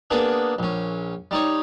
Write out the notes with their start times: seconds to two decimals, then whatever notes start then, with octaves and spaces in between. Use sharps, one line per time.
0.11 A#3 B3 D4 G#4
0.59 A#1 C#4
1.31 G3 D#4 C#5